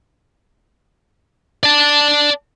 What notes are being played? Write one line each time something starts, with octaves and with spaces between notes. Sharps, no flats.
D5 A5